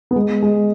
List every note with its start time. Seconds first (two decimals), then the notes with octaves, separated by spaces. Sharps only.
0.11 B3
0.16 G#3
0.42 G#3